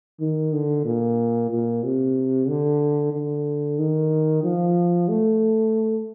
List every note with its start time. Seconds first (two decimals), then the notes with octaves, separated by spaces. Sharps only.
0.20 D#3
0.53 D3
0.85 A#2
1.51 A#2
1.83 C3
2.48 D3
3.13 D3
3.79 D#3
4.44 F3
5.09 A3